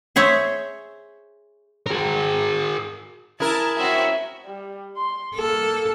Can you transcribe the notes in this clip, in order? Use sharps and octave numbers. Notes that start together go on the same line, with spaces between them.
G#4 C5 C#5 E5
G#4 A#4
E4 G#4 A#4 A5
C4 C#4 F#4 E5
G3
C6
A#3 A4